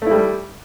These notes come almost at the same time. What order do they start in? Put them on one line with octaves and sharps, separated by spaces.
A3 E4 G3